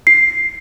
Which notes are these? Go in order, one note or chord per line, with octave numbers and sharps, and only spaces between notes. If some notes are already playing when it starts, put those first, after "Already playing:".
C7